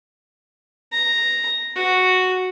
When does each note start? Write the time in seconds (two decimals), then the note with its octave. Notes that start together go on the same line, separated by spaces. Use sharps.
0.92 A#5
1.76 F#4